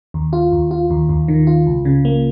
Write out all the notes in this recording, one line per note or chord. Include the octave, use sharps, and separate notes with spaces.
D#2
F4
D#2
F4
D#2
D#2
D#3
F4
C#2
C#3
A#3